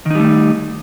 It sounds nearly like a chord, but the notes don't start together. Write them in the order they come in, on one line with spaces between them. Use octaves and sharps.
D#3 D#4 G3 A3